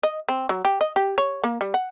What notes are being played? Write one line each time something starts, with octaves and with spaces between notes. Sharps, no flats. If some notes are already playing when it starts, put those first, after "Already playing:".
D#5
C4
F#3
G4
D#5
G4
C#5
A#3
G3
F#5